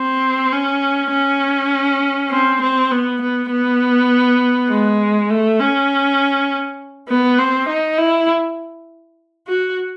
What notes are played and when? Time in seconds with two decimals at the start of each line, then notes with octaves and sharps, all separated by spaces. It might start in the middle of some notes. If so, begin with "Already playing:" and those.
Already playing: C4
0.53 C#4
1.12 C#4
2.31 C4
2.61 C4
2.91 B3
3.21 B3
3.51 B3
4.70 G#3
5.30 A3
5.60 C#4
7.08 B3
7.38 C4
7.68 D#4
7.98 E4
9.47 F#4